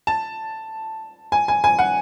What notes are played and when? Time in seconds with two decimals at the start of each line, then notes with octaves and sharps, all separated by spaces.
0.07 A5
1.32 G#5
1.48 G#5
1.64 G#5
1.79 F#5